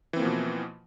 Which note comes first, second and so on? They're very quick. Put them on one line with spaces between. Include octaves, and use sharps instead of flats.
E3 C4 A#3 F3 B2